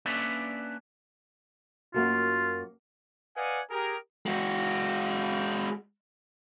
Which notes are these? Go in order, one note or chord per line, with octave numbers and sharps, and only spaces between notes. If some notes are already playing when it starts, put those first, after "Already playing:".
A#3 C#4 D4 B4 D5 E5
F#2 A#3 F4 F#4
B4 D5 D#5 F5 F#5 G#5
G4 G#4 A#4
G#3 F#4